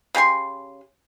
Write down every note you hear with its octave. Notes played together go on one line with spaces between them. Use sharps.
C#3 G4 G#5 C6